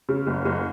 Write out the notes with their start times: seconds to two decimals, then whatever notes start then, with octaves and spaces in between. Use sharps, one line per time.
0.09 C#3
0.27 F#1
0.45 F#1